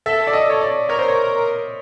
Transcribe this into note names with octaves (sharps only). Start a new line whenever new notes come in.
A4 E5
D5
D#5
C#5
D5
A#4 C#5
C5
C#5